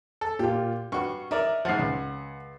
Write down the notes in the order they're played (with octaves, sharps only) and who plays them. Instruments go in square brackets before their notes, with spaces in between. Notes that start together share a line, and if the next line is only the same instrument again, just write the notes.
[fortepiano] A4
[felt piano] A#2 F4 [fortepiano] G4
[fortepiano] G2 F#4 [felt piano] C#6
[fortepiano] D#4 A#4 D5 [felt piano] E5
[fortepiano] G#2 F3 [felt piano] F#5 A6 C7
[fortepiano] C#2